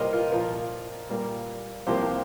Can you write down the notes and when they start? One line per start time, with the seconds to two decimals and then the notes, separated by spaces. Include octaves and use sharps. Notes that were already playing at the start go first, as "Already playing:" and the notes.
Already playing: C2 A#2 G3 A#3 G4 A#4 C5 D#5
0.13 F4 A#4
0.32 A#2 F3 A#3 F4 A#4
1.09 A#2 G3 A#3
1.87 C2 C3 F3 A#3 G4 C5